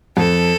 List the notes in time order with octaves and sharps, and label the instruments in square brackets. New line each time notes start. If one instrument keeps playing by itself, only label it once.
[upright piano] F2 [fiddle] A4